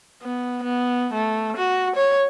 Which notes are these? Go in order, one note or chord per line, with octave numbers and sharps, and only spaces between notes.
B3
B3
A3
F#4
C#5